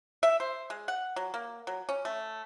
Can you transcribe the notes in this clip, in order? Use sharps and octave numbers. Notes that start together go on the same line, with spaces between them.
E5
C5
G#3
F#5
F#3
A#3
F#3
C#4
A3